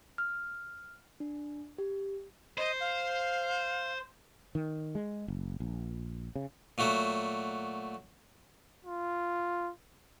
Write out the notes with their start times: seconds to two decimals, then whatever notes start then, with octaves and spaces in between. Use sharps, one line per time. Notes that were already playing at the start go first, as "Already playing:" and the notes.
0.18 F6
1.20 D4
1.78 G4
2.58 C5 D#5
2.80 F5
4.55 D#3
4.95 G#3
5.28 F#1
5.60 A#1
6.36 C#3
6.78 A#2 F#3 A3 F#4
8.85 F4